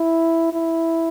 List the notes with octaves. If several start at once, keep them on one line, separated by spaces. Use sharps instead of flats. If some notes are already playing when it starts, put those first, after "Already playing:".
Already playing: E4
E4